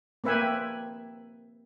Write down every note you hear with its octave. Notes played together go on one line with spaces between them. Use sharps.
A#3 C4 B4 E5 G5 G#5